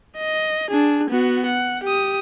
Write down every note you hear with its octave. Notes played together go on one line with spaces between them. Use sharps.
D#5
D4 G#4
B3 F#4
F#5
G4 D#6